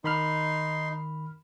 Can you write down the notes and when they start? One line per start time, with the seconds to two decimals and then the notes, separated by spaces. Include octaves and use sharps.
0.04 D#3 D#4 B5 C6 F6